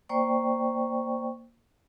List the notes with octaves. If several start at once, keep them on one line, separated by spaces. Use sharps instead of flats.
A#3 C5 D5 G5 C#6